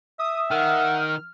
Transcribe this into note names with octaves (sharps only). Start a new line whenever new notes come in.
E5 D#6
D#3 F#5 F6